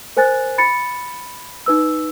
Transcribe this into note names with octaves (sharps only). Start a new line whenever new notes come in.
A#4 C5 G#5 F#6 A6
B5 A6 C#7
D#4 B4 E6